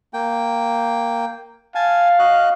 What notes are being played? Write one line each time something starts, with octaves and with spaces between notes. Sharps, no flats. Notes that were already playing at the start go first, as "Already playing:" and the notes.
A#3 G5
F5 G#5 A5
F#4 D#5 F#6